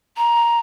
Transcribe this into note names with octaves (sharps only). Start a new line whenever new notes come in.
A#5